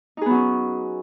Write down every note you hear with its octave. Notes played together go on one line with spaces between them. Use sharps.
F#3 B3 C#4 D#4 G#4